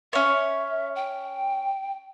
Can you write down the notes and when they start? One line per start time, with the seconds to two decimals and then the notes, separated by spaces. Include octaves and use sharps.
0.13 C#4 C#5 E5
0.96 G5